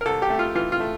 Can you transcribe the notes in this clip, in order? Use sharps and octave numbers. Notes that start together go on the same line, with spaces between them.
A#4
C2 A4
G4
A3
F4
E3 F4
F4
A3